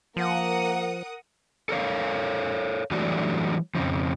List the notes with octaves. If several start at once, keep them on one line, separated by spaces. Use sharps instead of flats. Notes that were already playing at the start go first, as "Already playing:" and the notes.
F3 A#3 A#4 F#5 D#6
A4 A#4 C#5 F5
E3 F#3 G3 A3 D4 F#4
F2 A#2 C#3 F3